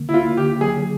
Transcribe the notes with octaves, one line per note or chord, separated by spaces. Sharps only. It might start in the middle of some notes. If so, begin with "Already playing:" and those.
Already playing: D3 A#3
E4
A#3 F4
D3 G4
F#3 G#4